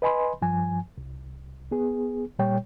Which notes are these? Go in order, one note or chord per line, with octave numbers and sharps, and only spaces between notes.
B4 D#5 G#5 B5 C6
G2 F3 G#5
C2
B3 G#4
A#2 G3 C#5 G5